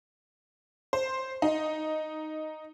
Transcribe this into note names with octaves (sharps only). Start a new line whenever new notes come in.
C5
D#4